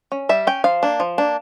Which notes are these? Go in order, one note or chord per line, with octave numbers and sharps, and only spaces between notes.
C#4
G3 E5
C#4 G5
F3 F5
A#3 D4
F3
A#3 D4